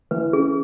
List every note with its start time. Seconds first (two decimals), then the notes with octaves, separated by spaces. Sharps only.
0.11 E3 B4
0.33 C#4 G#4